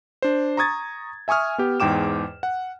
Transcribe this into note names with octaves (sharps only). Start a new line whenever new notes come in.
D4 C5
A#5 C#6 D#6 G#6 A6
E5 G#5 C#6 D#6 F6
B3 G4
E2 G#2 G5 D6 E7
F#5